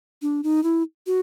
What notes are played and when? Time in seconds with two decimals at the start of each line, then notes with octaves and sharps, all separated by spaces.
0.22 D4
0.43 D#4
0.63 E4
1.07 F#4